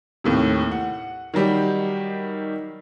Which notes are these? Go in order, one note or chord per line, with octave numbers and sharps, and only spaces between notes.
D#2 A2 C3
F#5
D#3 F#3 G3 G4